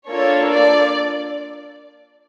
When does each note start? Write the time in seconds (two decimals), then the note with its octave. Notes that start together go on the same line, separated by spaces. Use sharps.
0.09 A#3 D4 F4 A4 C#5
0.51 D5